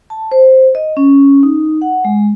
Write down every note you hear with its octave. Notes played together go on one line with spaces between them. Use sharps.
A5
C5
D#5
C#4
D#4
F#5
G#3